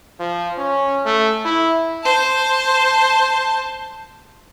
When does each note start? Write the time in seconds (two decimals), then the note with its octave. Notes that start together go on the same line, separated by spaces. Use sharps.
0.19 F3
0.58 C#4
1.05 A3
1.45 E4
2.03 C5 A5